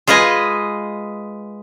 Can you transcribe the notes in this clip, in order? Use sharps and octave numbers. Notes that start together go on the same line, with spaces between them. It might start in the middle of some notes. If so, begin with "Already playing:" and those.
G#3 F4 B4 D#5 G#5